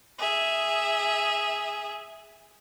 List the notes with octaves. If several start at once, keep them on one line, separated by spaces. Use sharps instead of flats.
G#4 E5